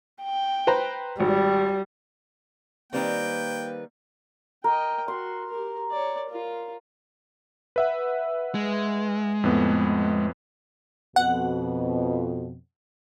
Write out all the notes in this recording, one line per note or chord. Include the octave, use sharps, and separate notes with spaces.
G5
B4 C5 A#5
G#1 G3
D#3 G3 A#3 C4 B4 G5
A#4 D#5 G5
F#4 C6
G4 A#4
C#5 D5
F4 A#4
B4 E5 F#5
G#3
F2 A2 B3
F2 B2 F#5